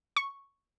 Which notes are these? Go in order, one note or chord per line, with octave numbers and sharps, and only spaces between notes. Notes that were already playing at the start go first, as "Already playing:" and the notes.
C#6